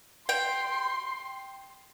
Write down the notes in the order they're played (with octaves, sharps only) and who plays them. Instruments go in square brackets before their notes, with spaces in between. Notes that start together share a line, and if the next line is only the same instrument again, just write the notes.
[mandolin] G5 [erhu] C6